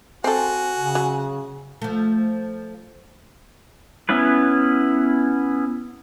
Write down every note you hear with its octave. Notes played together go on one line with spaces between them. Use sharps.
C4 F#4 A4 G#5
C#3
F#3
F3 A3
B3 C#4 E4 B4